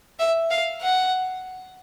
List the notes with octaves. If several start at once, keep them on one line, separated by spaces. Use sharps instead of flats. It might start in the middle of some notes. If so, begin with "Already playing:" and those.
E5
F5
F#5